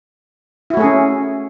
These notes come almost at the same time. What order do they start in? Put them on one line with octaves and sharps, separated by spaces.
E4 F#4 A3 G#4 C#4